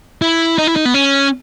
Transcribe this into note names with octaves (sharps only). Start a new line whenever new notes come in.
E4
D#4
E4
D#4
B3
C#4